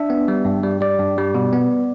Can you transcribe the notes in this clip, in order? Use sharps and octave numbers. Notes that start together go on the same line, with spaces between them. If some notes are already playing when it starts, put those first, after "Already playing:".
Already playing: D4 E5
B3
G3
G2
G3
G3 D5
G2
G3
B2
B3